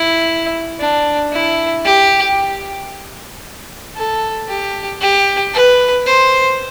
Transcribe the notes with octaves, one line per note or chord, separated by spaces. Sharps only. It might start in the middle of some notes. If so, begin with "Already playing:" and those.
Already playing: E4
D4
E4
G4
A4
G4
G4
B4
C5